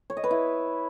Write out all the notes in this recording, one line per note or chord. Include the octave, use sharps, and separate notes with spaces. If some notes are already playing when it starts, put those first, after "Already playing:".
C#5
D#5
B4
E4